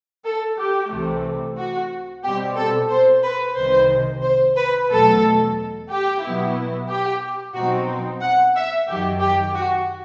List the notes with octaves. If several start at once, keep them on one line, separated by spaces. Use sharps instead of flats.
A4
G4
C2 C3 E3 A3
F#4
B2 G3 C4 G4
A4
C5
B4
C2 C3 D#3 C5
C5
B4
E2 B2 F#3 A3 A4
G4
B2 F#3 B3 E4
G4
B2 F#3 C4 D#4 F#4
F#5
E5
F#2 D#3 F#3 G4
G4
F#4